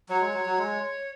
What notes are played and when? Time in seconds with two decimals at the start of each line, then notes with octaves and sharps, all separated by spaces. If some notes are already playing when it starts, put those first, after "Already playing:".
0.09 F#3 C#5
0.20 G#3
0.33 F#3
0.46 F#3
0.58 G#3